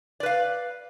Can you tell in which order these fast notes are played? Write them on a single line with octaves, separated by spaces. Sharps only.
D5 B4 F5